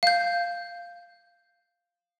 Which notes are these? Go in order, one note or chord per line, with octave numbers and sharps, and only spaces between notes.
F5 G6